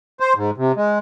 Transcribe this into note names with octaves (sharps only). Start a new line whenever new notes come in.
C5
G#2
C3
G#3